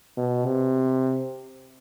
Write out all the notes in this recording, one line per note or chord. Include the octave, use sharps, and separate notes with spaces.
B2
C3